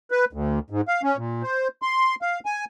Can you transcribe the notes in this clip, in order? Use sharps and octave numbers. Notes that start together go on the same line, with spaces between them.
B4
D2
G#2
F5
C#4
A#2
C5
C6
F5
G#5